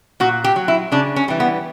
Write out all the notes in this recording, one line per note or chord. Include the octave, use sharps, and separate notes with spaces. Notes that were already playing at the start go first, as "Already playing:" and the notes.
A#2 F#4
G4
F#3
E4
C#3 D4
C#4
E3 G3
B3